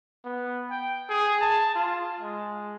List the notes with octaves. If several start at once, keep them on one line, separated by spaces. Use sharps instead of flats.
B3
G5
G#4
A5
F4
G#3